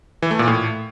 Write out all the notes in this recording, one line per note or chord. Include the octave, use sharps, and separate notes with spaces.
E3
A3
A#2
A2